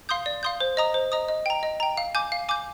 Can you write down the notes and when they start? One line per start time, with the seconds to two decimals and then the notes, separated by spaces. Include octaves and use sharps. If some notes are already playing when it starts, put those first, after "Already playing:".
0.09 F5 C6 D#6 G6
0.26 D5
0.43 F5 C6 D#6 G6
0.60 C5
0.77 D#5 A#5 D#6
0.94 C5
1.12 D#5 A#5 D#6
1.28 D#5
1.46 G5 A#5
1.63 D#5
1.80 G5 A#5
1.97 F5
2.15 G#5 D6 G6
2.32 F5
2.49 G#5 D6 G6